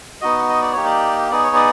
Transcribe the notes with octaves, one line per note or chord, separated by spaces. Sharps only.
B3 D#4 F#4 D#5
D#5
D5
A#3 D#4 G4 C#5
D5
B3 D#4 G#4 D5
C#5
D5